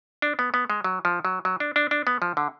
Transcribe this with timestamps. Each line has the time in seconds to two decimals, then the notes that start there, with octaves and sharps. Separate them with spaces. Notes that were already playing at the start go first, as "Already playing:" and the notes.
0.22 D4
0.39 B3
0.54 B3
0.70 G#3
0.84 F#3
1.05 F3
1.25 F#3
1.45 F#3
1.60 D4
1.76 D4
1.91 D4
2.07 B3
2.22 F3
2.37 D3